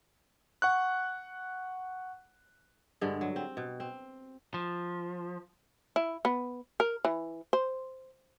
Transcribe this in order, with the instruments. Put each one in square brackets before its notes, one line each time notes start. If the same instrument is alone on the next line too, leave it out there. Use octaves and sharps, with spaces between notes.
[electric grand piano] F#5 C#6 F#6
[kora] G2 D3 G#3
F#3
C4
B2
C4
[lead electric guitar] F3
[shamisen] E4
B3
A#4
E3
C5